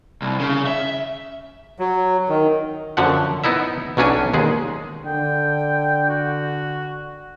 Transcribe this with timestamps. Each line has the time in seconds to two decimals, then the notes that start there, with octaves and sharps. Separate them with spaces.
0.22 C2
0.40 C#3
0.67 E5
1.79 F#3
2.29 D#3
2.97 F#2 D3 F3 F#5
3.44 B3 D#4 E4 E5
3.97 B1 F#3 C#4 D4 G#5
4.33 D#2 G#3 G#4
5.06 D3 G5
6.09 F#4